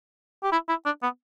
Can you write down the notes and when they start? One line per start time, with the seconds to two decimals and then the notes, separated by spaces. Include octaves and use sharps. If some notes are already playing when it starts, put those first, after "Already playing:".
0.44 G4
0.52 E4
0.69 E4
0.86 D4
1.03 B3